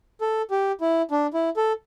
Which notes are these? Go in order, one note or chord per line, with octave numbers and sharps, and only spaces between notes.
A4
G4
E4
D4
E4
A4